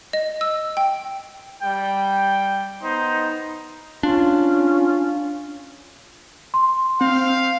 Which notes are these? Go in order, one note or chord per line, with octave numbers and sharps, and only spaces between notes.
D#5
E6
G5
G3 G5
B3 D#4 C5
C#4 D4 F4
C6
C4 F5